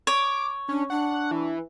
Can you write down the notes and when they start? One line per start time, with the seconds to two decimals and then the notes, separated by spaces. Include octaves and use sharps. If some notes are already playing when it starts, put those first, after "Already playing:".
0.07 C#5 D6
0.69 C#4 D4
0.90 D4 F#5
1.31 E3